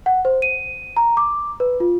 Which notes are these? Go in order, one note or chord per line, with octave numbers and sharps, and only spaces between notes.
F#5
C5
D#7
A#5
D6
B4
F4